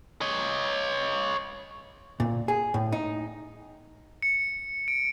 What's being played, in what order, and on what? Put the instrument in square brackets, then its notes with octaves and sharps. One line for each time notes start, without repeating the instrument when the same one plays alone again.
[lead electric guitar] C#5 D#5
[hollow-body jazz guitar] A#2
G#4
A2
D#4
[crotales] C#7
D7